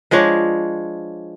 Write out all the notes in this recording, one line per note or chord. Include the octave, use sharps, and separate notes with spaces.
F3 G#3 D4 C#5